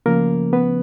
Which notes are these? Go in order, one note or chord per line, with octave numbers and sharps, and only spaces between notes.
C#3 F3 A3 A#3 C#4 A#4
B3 B4